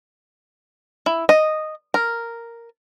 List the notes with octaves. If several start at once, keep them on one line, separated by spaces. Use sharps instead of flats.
E4
D#5
A#4